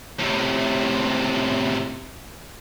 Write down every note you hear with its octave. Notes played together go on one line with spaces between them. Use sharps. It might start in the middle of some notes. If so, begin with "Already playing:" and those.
A2 C3